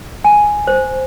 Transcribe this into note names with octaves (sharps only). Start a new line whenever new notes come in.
G#5
C5